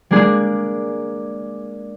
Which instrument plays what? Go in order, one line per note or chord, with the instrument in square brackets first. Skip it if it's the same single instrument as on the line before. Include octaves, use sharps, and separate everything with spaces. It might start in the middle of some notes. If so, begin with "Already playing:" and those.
[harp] G#3 A#3 D4 G#4